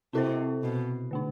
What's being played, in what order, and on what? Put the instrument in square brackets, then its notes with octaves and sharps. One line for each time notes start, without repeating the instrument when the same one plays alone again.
[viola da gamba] C3 [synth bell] C4 E4 A4 C5
[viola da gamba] B2
[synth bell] D3 A3 D4